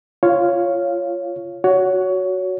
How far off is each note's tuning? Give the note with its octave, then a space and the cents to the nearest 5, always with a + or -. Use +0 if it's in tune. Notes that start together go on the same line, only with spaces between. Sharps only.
F4 -15 C#5 +0 F5 +0
F#4 +0 C#5 +20